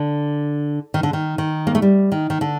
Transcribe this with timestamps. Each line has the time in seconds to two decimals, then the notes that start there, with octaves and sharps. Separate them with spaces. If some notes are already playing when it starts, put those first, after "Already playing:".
Already playing: D3
0.94 D#3
1.03 D3
1.13 D#3
1.38 D#3
1.67 A#3
1.75 A3
1.82 G3
2.12 D#3
2.30 D#3
2.41 D3